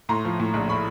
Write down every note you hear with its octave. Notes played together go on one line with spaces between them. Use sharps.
A2 A#5 C6
F3
A2
A#1
B5 C#6